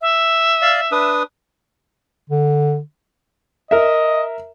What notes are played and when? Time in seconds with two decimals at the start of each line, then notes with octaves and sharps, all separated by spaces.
0.01 E5
0.62 D5 F5
0.92 D4 B4 D#6
2.30 D3
3.71 A#4 D#5 E5